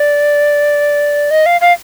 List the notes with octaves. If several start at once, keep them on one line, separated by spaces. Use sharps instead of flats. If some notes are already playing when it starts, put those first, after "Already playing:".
Already playing: D5
D#5
F5
F5